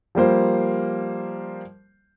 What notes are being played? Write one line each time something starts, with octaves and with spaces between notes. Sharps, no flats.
F3 G3 A#3 C5